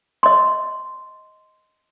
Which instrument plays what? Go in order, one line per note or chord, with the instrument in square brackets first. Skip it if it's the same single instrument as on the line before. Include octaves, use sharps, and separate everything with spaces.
[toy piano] D#5 C6